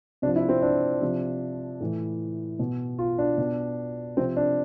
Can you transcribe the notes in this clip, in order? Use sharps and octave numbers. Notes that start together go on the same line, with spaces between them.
C3 F3 D4
E4
C4
D4
C3 F3
A2 E3
B2
F4
D4
B2
C3 F3 C4
D4